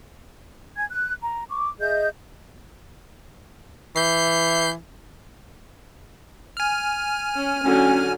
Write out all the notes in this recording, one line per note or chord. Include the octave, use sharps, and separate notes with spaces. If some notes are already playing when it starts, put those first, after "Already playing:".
G#5 G#6
F#6
A#5
C#6 D6
G#4 D#5 E5 G6
E3 G6 C7
G#5 F6
C#4
D3 F#3 C#4